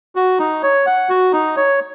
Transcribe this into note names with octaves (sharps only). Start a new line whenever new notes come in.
F#4
D#4
C#5
F#5
F#4
D#4
C#5